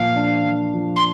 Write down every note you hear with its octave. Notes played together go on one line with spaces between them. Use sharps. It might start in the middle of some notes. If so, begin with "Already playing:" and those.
Already playing: A#2 F3 F5
D4
F3
F3
C6